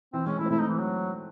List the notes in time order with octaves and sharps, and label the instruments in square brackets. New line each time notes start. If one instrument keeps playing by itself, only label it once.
[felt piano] E3 [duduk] C4
[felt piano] G#3 [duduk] C#4
[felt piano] A3 [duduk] E4
[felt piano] C4
[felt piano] A3 [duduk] E4
[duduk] D#4
E3
F#3